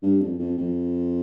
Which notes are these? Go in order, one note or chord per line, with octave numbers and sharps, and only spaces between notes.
G2
F2
F2
F2